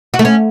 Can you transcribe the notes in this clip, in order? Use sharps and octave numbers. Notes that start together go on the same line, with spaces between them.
F#4
A3
C#4